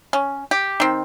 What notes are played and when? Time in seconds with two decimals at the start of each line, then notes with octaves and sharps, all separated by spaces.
0.13 C#4
0.51 G4
0.80 D#3 C4